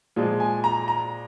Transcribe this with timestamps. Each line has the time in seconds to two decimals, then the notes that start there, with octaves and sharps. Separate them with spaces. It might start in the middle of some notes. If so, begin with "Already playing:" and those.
0.16 A#2 F3 G#3
0.40 G#5
0.64 A#5
0.88 A#5